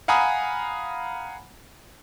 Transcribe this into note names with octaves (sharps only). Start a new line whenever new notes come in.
F5 F#5 G#5 A#5 B5 D#6